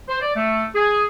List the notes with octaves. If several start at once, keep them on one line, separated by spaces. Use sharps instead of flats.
C5
D5
A3
G#4